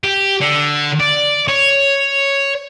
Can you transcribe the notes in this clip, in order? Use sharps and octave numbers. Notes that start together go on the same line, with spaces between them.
G4
D3
D5
C#5